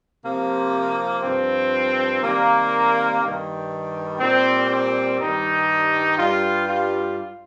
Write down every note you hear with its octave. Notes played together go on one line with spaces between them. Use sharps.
C3 F3 A#3
G2 F3 C4
C3 D#3 G3 A#3
G2 D#3 G3
A#2 G3 C4
C4
G2 D#3 G3 D#4
G2 G3 F4
F4